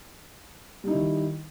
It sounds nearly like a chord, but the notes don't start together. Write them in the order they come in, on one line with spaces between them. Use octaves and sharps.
G3 D#4 E4 D#3